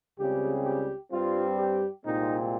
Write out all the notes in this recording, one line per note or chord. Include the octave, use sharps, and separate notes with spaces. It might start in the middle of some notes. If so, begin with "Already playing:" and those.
C#2 C#3 G3 C4 G4
G4
G2 G3 C4 F4
G4
C2 A#2 G#3 C4 D#4